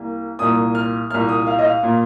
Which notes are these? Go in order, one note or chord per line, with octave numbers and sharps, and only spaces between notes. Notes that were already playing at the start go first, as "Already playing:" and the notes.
Already playing: C2 A#3
C2 A#2 A#3 D#6
F6
C2 A#2 A#3 F6
D#6
F5
D#5
F5
A#2 A#3